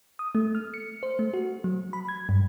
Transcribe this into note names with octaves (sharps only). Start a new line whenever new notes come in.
D#6
A3
F6
C#7
C5
A3
F#4
F#3
B5
G#6
G2